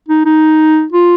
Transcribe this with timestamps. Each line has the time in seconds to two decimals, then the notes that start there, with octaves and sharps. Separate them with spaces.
0.09 D#4
0.25 D#4
0.92 F4